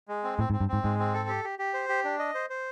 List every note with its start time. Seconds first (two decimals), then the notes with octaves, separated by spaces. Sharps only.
0.08 G#3
0.24 C4
0.39 A2 C4
0.50 G#2
0.53 C4
0.60 G2
0.69 G#2 C4
0.83 G#2 G#3
0.99 C4
1.14 A4
1.29 G4
1.44 G4
1.59 G4
1.74 C5
1.89 G4
2.04 D4
2.19 D#5
2.35 C5
2.50 C5